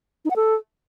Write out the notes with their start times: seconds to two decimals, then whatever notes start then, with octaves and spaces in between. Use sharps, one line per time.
0.25 D#4
0.30 F#5
0.36 A4